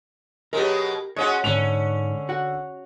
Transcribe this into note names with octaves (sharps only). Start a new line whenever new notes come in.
B2 F#3 G#3 G4 A#4
G#3 C#4 F#4 C#5 D#5 F#5
G#2 D3 C#4 F7
F#4 F#5